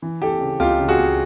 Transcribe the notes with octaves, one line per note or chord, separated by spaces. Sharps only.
E3
E3 G4 A4
C#3
C#2 F4 G4
C#3
F#4 G#4
C#2